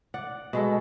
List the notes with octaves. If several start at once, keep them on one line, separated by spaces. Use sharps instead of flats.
D5 F#5
B2 G#3 A4